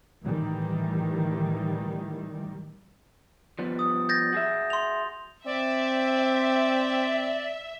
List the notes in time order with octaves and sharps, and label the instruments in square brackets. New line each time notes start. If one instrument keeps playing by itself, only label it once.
[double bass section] A2 D#3 E3 G3
[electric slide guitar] F3 G3 B3
[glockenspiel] D#6
G6 A6 A#6
[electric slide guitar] F#4 G#4 E5
[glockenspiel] C6 F7
[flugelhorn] C4 [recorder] D5 [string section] E5